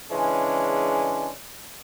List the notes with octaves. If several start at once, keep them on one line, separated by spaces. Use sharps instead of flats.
C#3 E3 G#3 C#4 D4